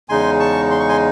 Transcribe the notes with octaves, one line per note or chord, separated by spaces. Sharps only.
E2 C#3 G#3 D#4 G#5 C6
A5 C#6
C6
C#6
G#5 C6